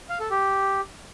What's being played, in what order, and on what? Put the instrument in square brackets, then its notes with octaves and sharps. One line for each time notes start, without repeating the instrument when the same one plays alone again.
[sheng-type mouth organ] F5
A4
G4